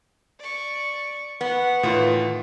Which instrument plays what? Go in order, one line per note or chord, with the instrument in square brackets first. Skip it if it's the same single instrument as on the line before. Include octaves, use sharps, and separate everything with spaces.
[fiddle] D5 C#6
[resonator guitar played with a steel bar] B3 [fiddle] F#5 C#6
[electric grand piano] A2 F4 [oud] D#3 E3